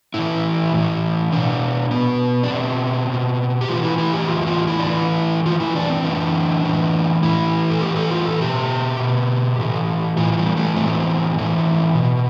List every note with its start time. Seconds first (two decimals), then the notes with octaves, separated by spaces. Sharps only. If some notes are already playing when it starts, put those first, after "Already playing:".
0.14 A2 E3 E4
0.73 A2 E3
1.32 B2 D4
1.91 B2 B3
2.43 D4
2.50 B2 C4
3.10 B2
3.61 G4
3.68 A2 E3 F4
3.83 E4
3.98 E4
4.13 G4
4.28 A2 E3 F4
4.47 F4
4.67 E4
4.79 D4
4.86 A2 E3 E4
5.46 A2 E3 F4
5.60 E4
5.76 D4
5.90 C4
6.04 A2 E3 D4
6.64 A2 E3
7.23 A2 E3 E4
7.70 A4
7.81 A2 E3 G4
7.96 A4
8.11 F4
8.25 A4
8.40 B2 G4
9.00 B2
9.58 A2 E3
10.17 A2 E3 F4
10.37 G3
10.57 A3
10.76 A2 E3 C4
11.36 A2 E3
11.95 B2